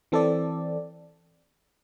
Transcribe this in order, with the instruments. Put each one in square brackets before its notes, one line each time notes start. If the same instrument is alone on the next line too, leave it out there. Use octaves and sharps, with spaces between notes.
[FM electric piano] E3 C4 A4 D5